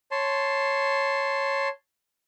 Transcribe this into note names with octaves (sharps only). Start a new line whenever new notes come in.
C#5 A5 C6